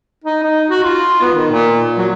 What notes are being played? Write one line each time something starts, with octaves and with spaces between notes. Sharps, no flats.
D#4
D#4
F#4
F4
B3
D#3
A#2
F#3